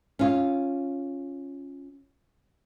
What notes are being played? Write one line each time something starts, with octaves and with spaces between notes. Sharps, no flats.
C#4 F4